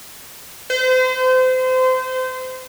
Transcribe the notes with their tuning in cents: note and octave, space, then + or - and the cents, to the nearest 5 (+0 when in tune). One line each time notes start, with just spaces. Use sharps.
C5 -30